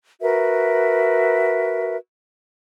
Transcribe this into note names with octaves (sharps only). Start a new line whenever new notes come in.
F#4 A#4 B4 E5